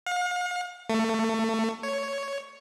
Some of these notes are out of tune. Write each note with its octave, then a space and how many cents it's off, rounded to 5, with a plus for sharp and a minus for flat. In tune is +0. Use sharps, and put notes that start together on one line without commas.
F5 +45
A3 +25
C#5 +5